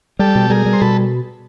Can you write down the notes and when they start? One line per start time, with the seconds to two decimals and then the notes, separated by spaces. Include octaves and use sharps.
0.19 G3 G4 A4
0.35 B2
0.50 G3 G#4 A#4
0.66 G3
0.73 C5
0.81 B2 A4 B4